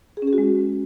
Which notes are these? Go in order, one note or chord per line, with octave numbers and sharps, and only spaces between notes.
G#4
C#4
G#4
F#4
G#3